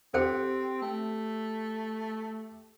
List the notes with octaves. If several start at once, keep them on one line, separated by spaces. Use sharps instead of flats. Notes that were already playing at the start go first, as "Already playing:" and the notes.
C4 G4 A4 C5 G5
A3